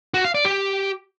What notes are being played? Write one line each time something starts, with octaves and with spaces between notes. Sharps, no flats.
F#4
F5
D5
G4